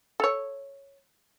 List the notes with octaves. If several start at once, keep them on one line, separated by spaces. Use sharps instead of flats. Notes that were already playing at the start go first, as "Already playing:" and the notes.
A4 C#5